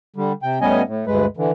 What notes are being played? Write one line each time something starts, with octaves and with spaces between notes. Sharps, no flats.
D3 G3
C3 G5
A2 G3 B3 C#4 D#5 G#5
A2
D2 G2 G#3 B4
D3 E3